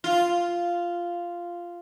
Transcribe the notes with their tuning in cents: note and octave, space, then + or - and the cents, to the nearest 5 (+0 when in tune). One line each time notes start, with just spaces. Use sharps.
F4 -5